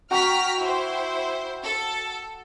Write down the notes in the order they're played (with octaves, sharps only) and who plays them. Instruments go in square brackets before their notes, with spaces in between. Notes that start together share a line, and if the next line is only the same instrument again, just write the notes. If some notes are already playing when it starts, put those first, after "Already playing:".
[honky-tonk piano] F#4 G5 C#6 [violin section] A#5 F6 B6
[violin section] E4 C5
A4